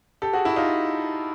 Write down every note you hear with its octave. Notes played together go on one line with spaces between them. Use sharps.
G4 A4
F#4 G#4
E4 F#4
D#4 F4